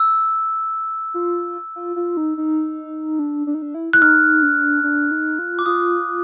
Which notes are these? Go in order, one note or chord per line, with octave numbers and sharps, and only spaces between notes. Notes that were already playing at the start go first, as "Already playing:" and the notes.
Already playing: E6
F4
F4
F4
D#4
D#4
D4
D4
D#4
D4
E4
E4 F#6
D#4 F6
D4
D4
D#4
F4
D6
F4 D#6